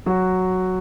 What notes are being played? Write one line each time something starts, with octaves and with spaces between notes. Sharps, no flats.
F#3 F#4